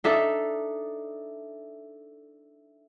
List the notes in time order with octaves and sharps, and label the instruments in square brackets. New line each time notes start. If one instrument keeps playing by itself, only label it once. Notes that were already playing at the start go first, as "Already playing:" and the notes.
[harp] D4 D#4 A4 E5